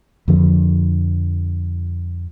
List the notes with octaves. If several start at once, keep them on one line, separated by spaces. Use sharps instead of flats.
F2 D3 F3